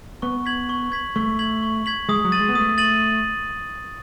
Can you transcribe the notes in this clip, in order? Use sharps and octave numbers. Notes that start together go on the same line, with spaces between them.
B3 C#6
G#6 B6 F#7
C#6
G#6 B6 F#7
A3 C#6
G#6 B6 F#7
C#6
G#6 B6 F#7
G#3 D#6
F#3
A6 D#7 F#7
G#3
B3
A3 D#6
A6 D#7 F#7